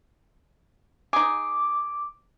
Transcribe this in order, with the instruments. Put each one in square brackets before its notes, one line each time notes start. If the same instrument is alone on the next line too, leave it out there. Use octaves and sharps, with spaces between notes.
[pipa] D#4 G#4 [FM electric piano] D6